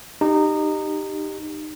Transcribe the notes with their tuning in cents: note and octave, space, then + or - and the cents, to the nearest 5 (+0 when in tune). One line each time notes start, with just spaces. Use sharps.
D#4 -20 G4 +0